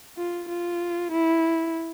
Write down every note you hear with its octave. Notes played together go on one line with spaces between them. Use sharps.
F4
F4
E4